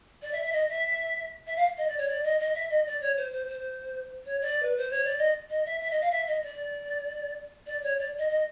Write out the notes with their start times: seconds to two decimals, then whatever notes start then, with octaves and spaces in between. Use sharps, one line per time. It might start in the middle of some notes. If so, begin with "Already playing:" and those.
0.22 D5
0.32 E5
0.42 E5
0.52 D#5
0.68 E5
1.46 E5
1.56 F5
1.77 D#5
1.87 D5
1.98 C#5
2.08 D5
2.23 D#5
2.39 D#5
2.54 E5
2.69 D#5
2.86 D5
3.01 C#5
3.16 C5
3.32 C5
3.47 C5
4.25 C#5
4.41 D5
4.62 B4
4.77 C5
4.90 C#5
5.04 D5
5.18 D#5
5.49 D#5
5.65 E5
5.80 E5
5.90 D#5
6.01 F5
6.11 E5
6.27 D#5
6.43 D5
7.66 D5
7.82 C#5
7.98 D5
8.18 D#5
8.29 D#5